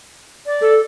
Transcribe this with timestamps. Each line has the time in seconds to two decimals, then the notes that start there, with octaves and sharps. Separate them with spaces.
0.46 D5
0.61 A4